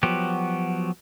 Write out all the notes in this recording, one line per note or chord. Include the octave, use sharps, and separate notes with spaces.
F3 F#3 B3 F#4 G4